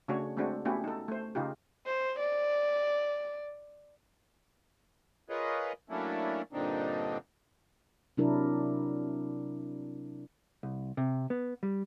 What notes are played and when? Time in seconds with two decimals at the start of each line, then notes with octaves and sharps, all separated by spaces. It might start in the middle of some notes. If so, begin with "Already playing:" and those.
0.08 C#3 A3 D4 F#4 C#5
0.37 G#3 A3 C4 D4 F#4
0.65 A3 B3 C#4 E4 F#4 G4
0.84 D#4 A4
1.08 A3 C5
1.35 C#3 D#4 F4 G4
1.87 C5
2.19 D5
5.29 F4 G#4 A#4 B4 C#5 D#5
5.90 F#3 A3 A#3 C#4 D4 E4
6.53 G2 A#2 D3 C4 D4 D#4
8.17 C3 F#3 D4 E4 A#4
10.63 C2
10.97 C3
11.30 B3
11.63 G3